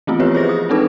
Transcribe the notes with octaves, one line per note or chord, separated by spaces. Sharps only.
E3 A3 B3 C4 E4 F4
F3 F4 G4 B4 C#5
G#4 C5 D#5 A#6
D#6
G#3 C4 D4 D#4 A4 B4